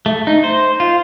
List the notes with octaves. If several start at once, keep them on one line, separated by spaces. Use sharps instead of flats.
A3
D#4
C5
F4